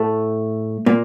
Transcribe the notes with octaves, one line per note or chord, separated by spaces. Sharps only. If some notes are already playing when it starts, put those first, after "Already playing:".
Already playing: A2 A3
A#2 A#3